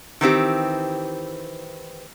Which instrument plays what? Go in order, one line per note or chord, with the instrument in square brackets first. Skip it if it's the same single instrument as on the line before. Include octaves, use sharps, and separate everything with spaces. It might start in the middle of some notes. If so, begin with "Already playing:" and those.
[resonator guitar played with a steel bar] D#3 E3 C4 G4